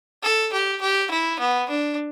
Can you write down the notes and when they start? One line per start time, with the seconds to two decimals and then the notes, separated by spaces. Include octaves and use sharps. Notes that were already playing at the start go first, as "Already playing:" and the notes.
0.23 A4
0.53 G4
0.81 G4
1.11 E4
1.40 B3
1.70 D4